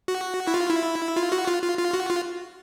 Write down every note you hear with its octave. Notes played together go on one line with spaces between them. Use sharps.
F#4
E4
F4
E4
F4
F#4
F4
F4
F4
F#4
F4